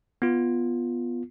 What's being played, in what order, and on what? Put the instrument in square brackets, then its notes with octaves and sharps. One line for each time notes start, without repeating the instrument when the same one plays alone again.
[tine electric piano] B3 F4